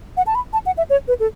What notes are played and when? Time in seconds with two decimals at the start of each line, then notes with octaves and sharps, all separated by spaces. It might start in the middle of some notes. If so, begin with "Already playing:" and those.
0.17 F#5
0.27 A5
0.35 B5
0.53 A5
0.66 F#5
0.77 E5
0.90 C#5
1.08 B4
1.20 A4